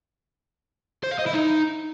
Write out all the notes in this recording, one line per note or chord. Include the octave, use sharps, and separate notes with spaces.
C5
F5
D#5
E4
D#4